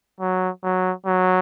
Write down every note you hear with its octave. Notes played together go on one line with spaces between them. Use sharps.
F#3
F#3
F#3